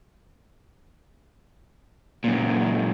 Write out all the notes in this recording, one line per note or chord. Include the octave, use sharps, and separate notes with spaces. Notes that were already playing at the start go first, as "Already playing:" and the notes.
F#2 A#2